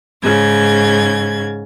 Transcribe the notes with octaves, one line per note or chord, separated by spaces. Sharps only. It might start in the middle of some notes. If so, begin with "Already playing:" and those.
G#2 C#3 G#6